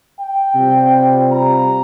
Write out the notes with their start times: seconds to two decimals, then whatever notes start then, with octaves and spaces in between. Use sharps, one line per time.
0.17 G5
0.54 C3 G3 C4 F4
1.30 A#5